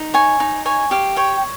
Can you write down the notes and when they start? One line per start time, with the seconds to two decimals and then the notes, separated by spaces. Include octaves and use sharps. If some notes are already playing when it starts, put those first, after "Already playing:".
Already playing: D#4
0.14 C#5 G#5
0.40 D#4
0.66 C#5 G#5
0.91 G4 F5
1.17 C#5 G5